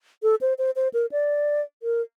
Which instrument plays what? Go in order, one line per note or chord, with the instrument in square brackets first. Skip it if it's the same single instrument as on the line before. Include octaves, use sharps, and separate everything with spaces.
[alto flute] A4
C5
C5
C5
A#4
D5
A#4